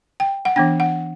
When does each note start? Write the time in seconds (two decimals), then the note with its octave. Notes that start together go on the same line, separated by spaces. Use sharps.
0.20 G5
0.45 F#5
0.56 E3 B3 D4 G5
0.80 F#5